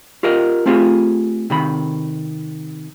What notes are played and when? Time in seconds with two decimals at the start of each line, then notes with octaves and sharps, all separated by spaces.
0.23 F4 G4 A#4 D#5
0.66 A3 C4 F4 G4 G#4
1.50 C3 D#3 B5